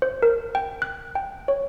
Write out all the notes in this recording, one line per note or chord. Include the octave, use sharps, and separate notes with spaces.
C5
A#4
G5
F#6
G5
C#5